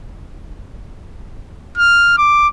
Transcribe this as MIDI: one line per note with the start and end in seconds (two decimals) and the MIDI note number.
1.78 2.14 89
2.18 2.48 86